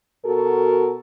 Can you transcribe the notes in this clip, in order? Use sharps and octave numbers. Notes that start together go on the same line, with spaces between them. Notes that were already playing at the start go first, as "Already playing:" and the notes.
B2 F#4 A4 A#4